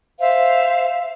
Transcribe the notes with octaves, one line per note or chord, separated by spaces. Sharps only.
C5 E5 F5